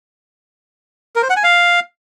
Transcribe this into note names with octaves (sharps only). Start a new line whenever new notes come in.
A#4
C5
F#5
G#5
F5